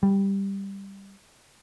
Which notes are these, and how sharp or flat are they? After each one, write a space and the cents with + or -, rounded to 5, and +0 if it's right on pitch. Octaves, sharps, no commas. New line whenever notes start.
G3 +5